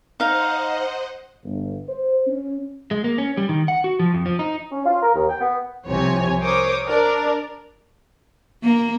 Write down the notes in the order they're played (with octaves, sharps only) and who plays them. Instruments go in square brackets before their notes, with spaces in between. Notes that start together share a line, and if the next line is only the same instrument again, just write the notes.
[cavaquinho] D#4 F5 [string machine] C5 D#5 F#5
[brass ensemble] G1
C5
C#4
[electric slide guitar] G#3
A#3
C#4
G3
D#3
F#5
F#4
F3
F2
F3
D#4
[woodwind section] C#4
F4
A#4
D#2
G5
B3
[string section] C2 C3 F3 C#5 G#5
A#4 C5 C#5 D6 D#6
D4 A#4 D5
[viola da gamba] A#3